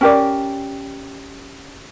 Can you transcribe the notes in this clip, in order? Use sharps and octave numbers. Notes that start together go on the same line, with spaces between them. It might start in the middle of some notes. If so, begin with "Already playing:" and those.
C#4 G4 A#4 D5